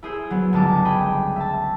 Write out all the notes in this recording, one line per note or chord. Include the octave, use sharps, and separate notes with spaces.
E4 G#4 C5 E6
F#3 B3
G1 C#2 G#3 A5 D6
G#4 G5 B5
E5 A5